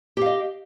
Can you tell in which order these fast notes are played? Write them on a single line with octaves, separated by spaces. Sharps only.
G4 F5 D#5